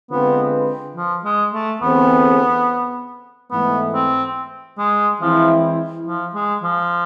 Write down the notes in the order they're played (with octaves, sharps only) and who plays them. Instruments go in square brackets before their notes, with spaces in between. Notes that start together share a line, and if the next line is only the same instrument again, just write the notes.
[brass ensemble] D3 G#3 C4 F4 B4 [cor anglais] B3
[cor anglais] F3
G#3
A3
[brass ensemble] E2 D3 A3 C4 G#4 [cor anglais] B3
[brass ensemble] G#2 E3 A3 [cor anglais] B3
[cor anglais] C4
G#3
[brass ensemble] E3 G#3 C4 E4 [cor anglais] F3
[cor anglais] F3
G#3
F3